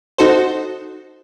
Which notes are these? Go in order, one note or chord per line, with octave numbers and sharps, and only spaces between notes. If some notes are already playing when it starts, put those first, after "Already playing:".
D#4 F#4 A4 C5